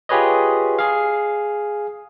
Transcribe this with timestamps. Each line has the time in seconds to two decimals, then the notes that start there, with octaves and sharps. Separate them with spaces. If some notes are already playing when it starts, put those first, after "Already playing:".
0.09 F4 G4 G#4 B4 C#5 D#5
0.79 G#4 F5